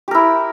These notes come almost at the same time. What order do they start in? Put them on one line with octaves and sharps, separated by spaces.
G4 A#4 E4